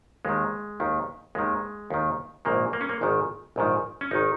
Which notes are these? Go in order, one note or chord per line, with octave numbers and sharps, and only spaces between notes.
D#2 D#3 G#3
D#2 D#3
D#2 D#3 G#3
D#2 D#3
A#1 G#2 D#3 A#3
A#3
C#4
A#3
G#1 G#2 D#3
A#1 G#2 D#3
C#4
G#1 D#3 D#4